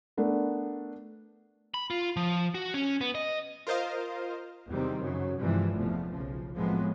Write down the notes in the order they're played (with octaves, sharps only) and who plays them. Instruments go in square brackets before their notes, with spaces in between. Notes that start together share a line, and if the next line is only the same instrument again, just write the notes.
[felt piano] A3 B3 D4 A#4
[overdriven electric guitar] B5
F4
F3
F#4
C#4
B3
D#5
[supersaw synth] F4 A#4 C5 D#5 F5
[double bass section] E2 C3 D#3 G3 C4
F#2 C#3 F#3
G2 C3 E3 F3 G3 G#3
F1 E2 B2 F3 A3
B1 C#3 F3
A2 F3 F#3 G#3 B3 C4